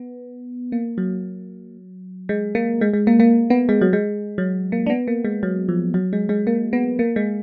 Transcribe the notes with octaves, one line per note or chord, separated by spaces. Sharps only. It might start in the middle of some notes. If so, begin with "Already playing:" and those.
Already playing: B3
A#3
F#3
G#3
A#3
G#3
G#3
A#3
A#3
B3
G#3
F#3
G#3
F#3
A#3
D4
B3
A#3
G#3
F#3
F3
F#3
G#3
G#3
A#3
B3
A#3
G#3